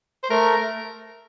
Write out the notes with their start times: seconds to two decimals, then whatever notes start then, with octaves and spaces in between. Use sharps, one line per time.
0.23 C5
0.30 A3 A#4